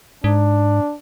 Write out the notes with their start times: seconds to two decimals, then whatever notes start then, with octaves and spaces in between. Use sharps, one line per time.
0.24 G#2 D4